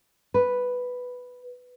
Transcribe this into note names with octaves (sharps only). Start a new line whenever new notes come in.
B4